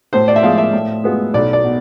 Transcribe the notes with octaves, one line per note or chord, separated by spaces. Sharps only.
A2 C5
D5
E5
F3 G#3 F5
E5
A2
G#3 B3 F4
B1 D5
D5
B2